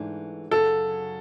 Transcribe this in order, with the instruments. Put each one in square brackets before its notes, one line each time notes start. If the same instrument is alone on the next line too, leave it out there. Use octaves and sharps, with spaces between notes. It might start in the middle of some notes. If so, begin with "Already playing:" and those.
Already playing: [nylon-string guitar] G#2 E3 A3 D4
[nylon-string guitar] F#2 C#3 F#3 [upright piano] A4